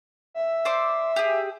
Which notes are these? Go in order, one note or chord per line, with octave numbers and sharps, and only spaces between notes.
E5
C5 D5 D6
G4 G#4